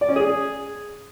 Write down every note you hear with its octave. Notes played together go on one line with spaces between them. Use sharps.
D5
C#4
G#4